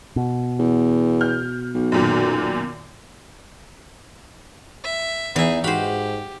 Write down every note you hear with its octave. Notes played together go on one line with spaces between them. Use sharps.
B2
E2
F6 G6
B1
F#2 A#2 D#3
E5
E2 E3 D#4 G#4 E5
G#2 F#4 G4 C5 F5 B5